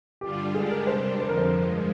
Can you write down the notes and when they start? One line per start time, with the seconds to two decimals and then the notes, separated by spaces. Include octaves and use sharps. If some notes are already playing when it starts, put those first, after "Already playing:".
0.21 G2 D3 G3 D4 F4 G4
0.54 D3 G#3 D4 G4 G#4
0.71 A#4
0.87 C3 G3 D4 C5
1.04 A#4
1.20 F2 D3 F3 C5
1.29 A#4
1.38 C5
1.53 G2 F3 G#3